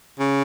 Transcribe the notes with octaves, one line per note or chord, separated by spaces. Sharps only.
C#3